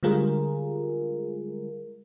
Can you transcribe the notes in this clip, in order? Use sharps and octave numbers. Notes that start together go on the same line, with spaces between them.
D3 G3 G#3 F4 G#4 A#4